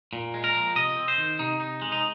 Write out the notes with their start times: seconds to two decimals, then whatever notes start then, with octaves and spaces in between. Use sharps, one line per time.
0.13 A#2
0.34 G#3
0.44 A#4
0.54 F3
0.75 C3 D#5
0.96 C4
1.08 C5
1.18 D#3
1.39 C3 D#4
1.60 D#4
1.82 G#3
1.92 D#4